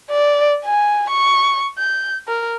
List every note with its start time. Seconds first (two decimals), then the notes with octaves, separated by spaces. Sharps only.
0.11 D5
0.65 G#5
1.10 C#6
1.79 G6
2.28 A#4